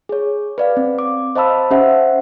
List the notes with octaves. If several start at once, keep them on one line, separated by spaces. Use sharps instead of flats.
G#4 C#5
B4 D5 F5
C4
D6
C5 D#5 F5 A5 B5 E6
C#4 G4 C5 E5 F#5